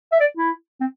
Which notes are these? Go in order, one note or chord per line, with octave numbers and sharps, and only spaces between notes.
E5
D5
E4
C4